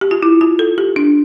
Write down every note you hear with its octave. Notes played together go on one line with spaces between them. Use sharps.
G4
F4
E4
F4
A4
G4
D4